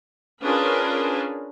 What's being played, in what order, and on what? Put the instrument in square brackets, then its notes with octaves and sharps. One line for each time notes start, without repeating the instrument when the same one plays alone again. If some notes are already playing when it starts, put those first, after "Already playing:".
[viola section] C#4 D4 F4 G#4 A#4 B4